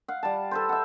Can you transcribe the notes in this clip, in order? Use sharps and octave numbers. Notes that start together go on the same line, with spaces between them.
F5 F#5
G3 A5
A4 B4 C5
E5 F#5